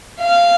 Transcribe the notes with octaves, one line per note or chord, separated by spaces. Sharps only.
F5